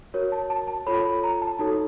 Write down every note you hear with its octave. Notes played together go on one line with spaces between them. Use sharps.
F#4 A#4 C#5
A5
A5
A5
F4 A4 C#5 B5
B5
A#5
A5
D#4 F#4 A4 C#5 A5